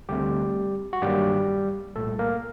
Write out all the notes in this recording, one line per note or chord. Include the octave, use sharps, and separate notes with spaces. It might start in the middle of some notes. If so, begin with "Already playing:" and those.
D2 D3 G3 A3 C4 G4
F#4
G2 D#3 F#3 G3 A#3 G4
C2 A#2 G3 A3 A4
A#3 A#4